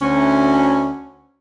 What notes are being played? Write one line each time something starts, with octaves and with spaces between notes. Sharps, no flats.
D2 C#4